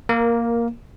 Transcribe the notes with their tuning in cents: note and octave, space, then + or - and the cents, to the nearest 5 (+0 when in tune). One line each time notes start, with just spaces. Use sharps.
A#3 +0 A#4 +15